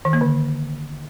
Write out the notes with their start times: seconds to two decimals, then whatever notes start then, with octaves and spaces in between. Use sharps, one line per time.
0.05 D#3
0.13 A#3
0.21 D3